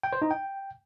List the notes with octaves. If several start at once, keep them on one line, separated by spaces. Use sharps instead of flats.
G5
C5
D#4
G5